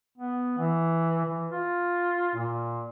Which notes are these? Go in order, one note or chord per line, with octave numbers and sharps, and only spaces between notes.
B3
E3
E3
F4
A#2